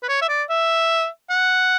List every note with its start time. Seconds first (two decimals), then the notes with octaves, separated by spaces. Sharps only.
0.03 B4
0.08 C#5
0.21 E5
0.29 D5
0.50 E5
1.30 F#5